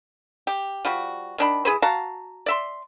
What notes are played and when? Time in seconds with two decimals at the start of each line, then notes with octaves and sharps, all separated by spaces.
0.47 G4
0.85 F3 G3 F#4
1.38 D#3 D4 B5
1.65 E3 G#4 B4 C5
1.82 F#4 F5 A5 A#5
2.46 D5 E5 C6